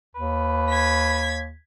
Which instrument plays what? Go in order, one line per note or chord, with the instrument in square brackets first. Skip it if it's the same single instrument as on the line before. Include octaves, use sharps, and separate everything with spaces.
[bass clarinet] D#2 [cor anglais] B4
[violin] G#6 B6